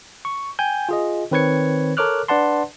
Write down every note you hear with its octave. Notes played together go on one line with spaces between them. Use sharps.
C#6
G5 G#5 G6
F4 G#4 D#5
D#3 C4 B4 C#5 G#6 C#7
A4 A#4 C#5 D6 F6 F#6
D4 B4 D5 F#5 A5 C6